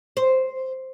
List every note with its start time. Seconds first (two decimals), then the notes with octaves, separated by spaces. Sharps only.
0.17 C5